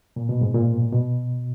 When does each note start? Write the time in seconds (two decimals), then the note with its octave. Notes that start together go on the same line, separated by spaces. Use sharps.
0.16 A#2
0.29 B2
0.41 G#2
0.54 A#2
0.93 B2